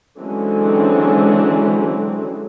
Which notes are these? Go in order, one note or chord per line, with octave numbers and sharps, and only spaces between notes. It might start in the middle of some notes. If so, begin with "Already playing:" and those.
D3 E3 F#3 G#3 C4 C#4